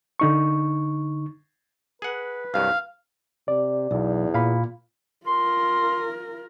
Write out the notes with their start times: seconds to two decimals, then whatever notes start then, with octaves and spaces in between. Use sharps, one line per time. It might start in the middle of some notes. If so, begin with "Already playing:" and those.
0.20 D3 D#4 C#6
2.02 G#4 B4 F#5
2.54 C2 G2 F#3 F5
3.48 C3 D5
3.91 B1 E2
4.34 A#2 F5 B5
5.27 F4 A#4 C6